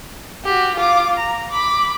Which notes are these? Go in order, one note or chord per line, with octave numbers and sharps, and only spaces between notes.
F#4 G4
F4 D6
A#5
B5 D6